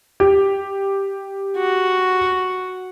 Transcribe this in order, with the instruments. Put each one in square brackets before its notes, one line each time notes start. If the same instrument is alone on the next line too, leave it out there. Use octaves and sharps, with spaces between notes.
[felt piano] G4
[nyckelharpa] F#4